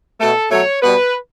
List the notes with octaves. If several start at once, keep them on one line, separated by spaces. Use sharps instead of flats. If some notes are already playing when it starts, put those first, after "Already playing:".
B2 A3 A4
B2 F#3 A3 C#5
B2 G3 B3 B4